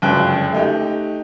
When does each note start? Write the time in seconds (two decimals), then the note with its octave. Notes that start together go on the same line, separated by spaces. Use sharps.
0.02 G1 C#2 F#2 D4 G5 F#6
0.52 A3 D#4 G4